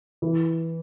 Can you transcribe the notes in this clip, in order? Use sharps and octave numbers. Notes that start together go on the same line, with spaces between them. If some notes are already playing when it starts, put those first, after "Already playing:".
E3